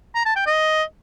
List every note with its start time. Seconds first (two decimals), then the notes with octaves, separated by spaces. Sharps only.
0.15 A#5
0.26 A5
0.36 G5
0.46 D#5